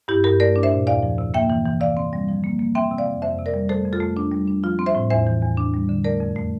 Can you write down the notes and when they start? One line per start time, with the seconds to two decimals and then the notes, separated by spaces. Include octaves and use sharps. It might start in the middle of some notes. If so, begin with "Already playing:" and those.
0.08 G2 E4 G4
0.24 G2 G4 A#4
0.40 A3 A#4 D5
0.56 D4
0.63 C5 E5
0.71 A#2
0.87 E2 D5 F5
1.03 F3
1.18 C3
1.34 A#3 E5 G5
1.50 E3
1.65 E3
1.81 C3 D5 F5
1.97 C4
2.13 G3
2.28 F3
2.44 A#3
2.59 A#3
2.75 C4 E5 G5
2.91 C3
2.98 D5 F5
3.06 F2
3.22 F2 C5 E5
3.38 C3
3.46 A#4 D5
3.54 G3
3.69 A3 A4 C5
3.85 F2
3.93 F4 A4
4.00 A3
4.17 D4
4.32 G3
4.48 D4
4.63 F3 F4
4.79 C4
4.86 C5 E5
4.95 A2
5.10 E2 C5 E5
5.27 E3
5.42 E2
5.57 D4
5.74 G3
5.89 D3
6.04 A3 A#4 D5
6.20 F2
6.36 A3